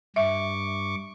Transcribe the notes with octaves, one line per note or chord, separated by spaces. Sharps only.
G2 E5 C#6 D6